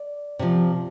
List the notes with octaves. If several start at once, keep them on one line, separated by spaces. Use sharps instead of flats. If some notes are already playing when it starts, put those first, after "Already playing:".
Already playing: D5
C3 F3